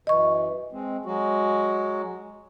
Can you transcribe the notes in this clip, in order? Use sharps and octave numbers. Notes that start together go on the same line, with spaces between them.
F#2 E3 D#5 C#6
G#3 C4
F#3 G#3 F#4